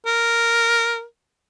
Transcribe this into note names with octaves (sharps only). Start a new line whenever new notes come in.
A#4